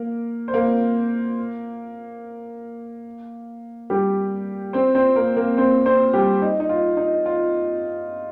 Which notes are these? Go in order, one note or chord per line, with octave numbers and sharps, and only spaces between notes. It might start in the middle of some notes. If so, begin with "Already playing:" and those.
Already playing: A#3 A#4
C5
A#3 A#4
G3 G4
C4 C5
C4 C5
A#3 A#4
A#3 A#4
C4 C5
C4 C5
G3 G4
D#4
D#4
F4
D#4
F4